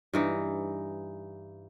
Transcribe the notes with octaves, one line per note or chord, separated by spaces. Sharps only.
G2 E3 D#4